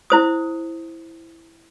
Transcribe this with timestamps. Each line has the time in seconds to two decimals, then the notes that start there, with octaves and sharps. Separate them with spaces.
0.10 E4 C5 D#6